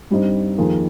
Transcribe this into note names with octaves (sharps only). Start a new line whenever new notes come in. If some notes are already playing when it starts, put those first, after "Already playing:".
G2 G3 C4 D#4
F2 D#3 A#3 F4 G#4